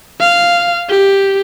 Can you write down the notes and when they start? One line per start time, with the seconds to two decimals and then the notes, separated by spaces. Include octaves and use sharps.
0.20 F5
0.90 G4